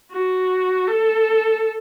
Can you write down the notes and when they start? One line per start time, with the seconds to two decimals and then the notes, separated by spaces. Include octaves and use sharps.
0.11 F#4
0.87 A4